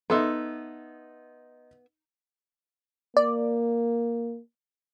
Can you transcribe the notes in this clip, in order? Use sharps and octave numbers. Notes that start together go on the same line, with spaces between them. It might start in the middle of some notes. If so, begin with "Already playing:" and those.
B3 D#4 A4 E5 C6
A#3 D5